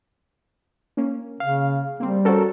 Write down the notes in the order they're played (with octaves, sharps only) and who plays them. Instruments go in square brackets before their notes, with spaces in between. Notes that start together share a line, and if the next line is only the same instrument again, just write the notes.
[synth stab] A#3 C#4
[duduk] C#3 [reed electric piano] F5
[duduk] G3 [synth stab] A#3 C4
[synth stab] C#4 F#4 C5 [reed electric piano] A4 A#4